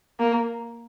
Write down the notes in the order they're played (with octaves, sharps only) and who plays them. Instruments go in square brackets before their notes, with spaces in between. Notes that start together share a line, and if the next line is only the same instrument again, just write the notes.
[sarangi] A#3